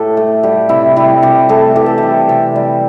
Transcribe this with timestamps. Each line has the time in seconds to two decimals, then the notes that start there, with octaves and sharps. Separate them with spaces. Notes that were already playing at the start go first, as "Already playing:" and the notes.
Already playing: A2 G4 A4
0.17 A3
0.43 G3 G4
0.69 C3 E4
0.96 G3 E4
1.22 C3 G4
1.49 A3 A4
1.76 E3 G4
1.86 A4
1.98 G3 G4
2.29 C3
2.56 G3